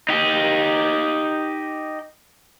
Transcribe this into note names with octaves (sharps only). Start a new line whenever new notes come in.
D#4 G4